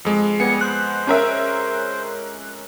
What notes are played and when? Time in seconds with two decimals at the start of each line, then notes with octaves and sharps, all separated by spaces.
0.05 F2 G#3
0.40 G3 B3 G#5 C#7
0.61 C5 F#6
1.07 C#4 A#4 E5